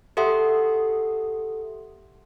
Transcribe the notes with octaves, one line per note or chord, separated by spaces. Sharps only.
G4 A4 E5 F#5 C6 D#6